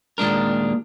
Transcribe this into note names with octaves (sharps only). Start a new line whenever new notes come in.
D#2 A#2 G#3 D4 A#4